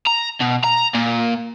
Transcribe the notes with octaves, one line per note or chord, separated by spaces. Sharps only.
A#5
B2
A#5
A#2